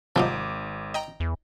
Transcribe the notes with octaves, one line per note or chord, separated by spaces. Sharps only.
G#1 C3 F3 F#3 D#4 D6
D#5 G5 A#5
E2